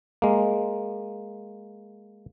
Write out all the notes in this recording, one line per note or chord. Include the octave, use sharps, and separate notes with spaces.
G#3 A#3